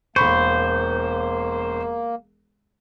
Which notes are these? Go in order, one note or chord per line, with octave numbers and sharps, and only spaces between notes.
E1 A#3 C5 B5 C#6